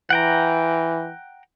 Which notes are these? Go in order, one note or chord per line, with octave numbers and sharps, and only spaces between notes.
E3 F#5 G5 A#5